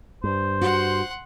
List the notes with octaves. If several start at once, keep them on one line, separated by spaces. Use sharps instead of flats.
G2 C5
F#4 F#5 C6